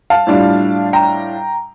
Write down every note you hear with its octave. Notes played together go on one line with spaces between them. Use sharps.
F5 A5
A2 G3 D4 F4
G5 A#5